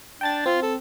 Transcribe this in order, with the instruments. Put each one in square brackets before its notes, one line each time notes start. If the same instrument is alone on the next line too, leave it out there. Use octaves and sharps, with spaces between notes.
[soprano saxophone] D4 [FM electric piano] G5 A5 A6
[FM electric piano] C4 [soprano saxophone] F4
[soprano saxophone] A4